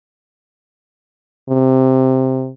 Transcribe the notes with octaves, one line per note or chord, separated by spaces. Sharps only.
C3